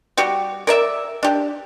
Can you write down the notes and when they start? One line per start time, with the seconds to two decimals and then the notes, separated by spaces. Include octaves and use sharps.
0.17 G3 F#4 G4
0.67 A#4 D5 E5
1.23 D4 G4